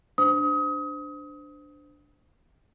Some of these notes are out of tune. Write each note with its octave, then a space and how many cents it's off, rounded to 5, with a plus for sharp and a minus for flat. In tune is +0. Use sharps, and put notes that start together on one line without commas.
D4 +0 C5 -25 D#6 +30